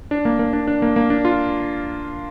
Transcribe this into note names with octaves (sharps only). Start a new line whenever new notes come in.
D4
A#3
A#3
D4
D4
A#3
A#3
D4
F4